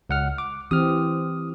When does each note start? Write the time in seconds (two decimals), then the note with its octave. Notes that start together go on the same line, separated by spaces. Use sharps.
0.09 C#2 F#5 F6
0.38 D6
0.71 E3 C4 G4 D#6 F6